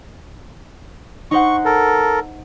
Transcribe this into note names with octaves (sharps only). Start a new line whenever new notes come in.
D#4 C5 F#5 C#6
A4 A#4